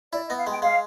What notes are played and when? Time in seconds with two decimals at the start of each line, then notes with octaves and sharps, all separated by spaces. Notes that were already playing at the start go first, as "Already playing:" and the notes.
0.13 E4 D5
0.26 D#5
0.30 B3
0.38 F5
0.47 G#3 G5
0.62 G#3 F5